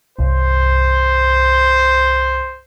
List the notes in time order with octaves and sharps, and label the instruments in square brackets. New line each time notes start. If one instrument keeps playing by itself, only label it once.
[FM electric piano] C2 G2 [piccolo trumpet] C5